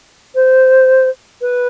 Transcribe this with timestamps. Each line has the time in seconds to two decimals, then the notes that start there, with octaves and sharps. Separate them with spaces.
0.35 C5
1.41 B4